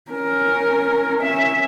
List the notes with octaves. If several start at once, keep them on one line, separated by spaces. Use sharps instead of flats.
C#4 A#4
C#4 E5